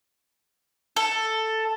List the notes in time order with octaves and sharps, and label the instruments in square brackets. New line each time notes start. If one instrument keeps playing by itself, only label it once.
[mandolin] A4